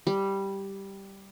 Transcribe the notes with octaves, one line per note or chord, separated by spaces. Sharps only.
G3